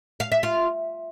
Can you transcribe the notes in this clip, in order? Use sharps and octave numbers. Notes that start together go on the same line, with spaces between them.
F5
E5
F4